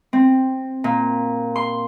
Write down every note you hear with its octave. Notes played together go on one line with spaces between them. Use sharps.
C4
A#2
C6